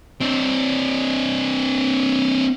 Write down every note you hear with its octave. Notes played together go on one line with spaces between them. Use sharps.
C4 D4